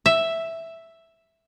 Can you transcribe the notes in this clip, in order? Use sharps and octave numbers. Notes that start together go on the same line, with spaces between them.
E5